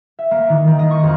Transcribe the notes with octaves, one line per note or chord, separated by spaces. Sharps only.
E5
A#3
D#3
D#3
D#5
C#6
F2